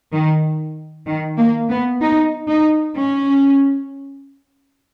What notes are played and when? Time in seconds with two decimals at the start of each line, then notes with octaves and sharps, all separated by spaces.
0.12 D#3
1.06 D#3
1.38 A#3
1.69 B3
2.01 D#4
2.48 D#4
2.95 C#4